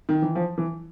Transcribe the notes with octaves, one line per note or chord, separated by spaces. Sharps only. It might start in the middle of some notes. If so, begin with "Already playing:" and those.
D#3
E3
F3
E3